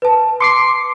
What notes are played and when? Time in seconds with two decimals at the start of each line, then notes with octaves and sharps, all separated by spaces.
0.02 B4 A5
0.40 C6 D6 C7 C#7